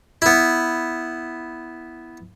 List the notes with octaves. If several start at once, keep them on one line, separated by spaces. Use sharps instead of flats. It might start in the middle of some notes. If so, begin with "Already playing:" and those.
B3 E4